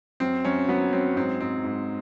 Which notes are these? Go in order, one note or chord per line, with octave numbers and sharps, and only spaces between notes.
F#2 C4
F#2 C#4
F#3 B3
F#3 C4
G#2 C4
G#2 C4
G#2